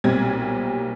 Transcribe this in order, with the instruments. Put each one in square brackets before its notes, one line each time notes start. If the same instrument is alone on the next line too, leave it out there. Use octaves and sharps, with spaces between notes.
[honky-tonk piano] B1 A#2 G3 C4 G#6